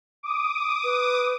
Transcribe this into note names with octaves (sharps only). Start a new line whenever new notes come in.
D6 D#6
B4